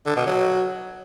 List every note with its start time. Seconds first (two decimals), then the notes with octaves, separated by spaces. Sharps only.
0.06 D3
0.16 B2
0.26 F#3